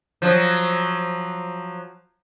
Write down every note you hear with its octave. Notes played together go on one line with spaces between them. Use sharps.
F3 F#3